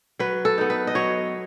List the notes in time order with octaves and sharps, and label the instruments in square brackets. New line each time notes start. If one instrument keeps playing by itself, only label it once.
[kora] F#3 B4
A4
B3 D#4
B4
D#5
F#3 C#5